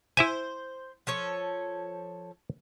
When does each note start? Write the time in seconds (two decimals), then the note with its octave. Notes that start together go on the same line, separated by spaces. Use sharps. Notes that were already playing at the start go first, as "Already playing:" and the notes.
0.17 E4 C5 E5 G#5
1.07 F3 A4 C#5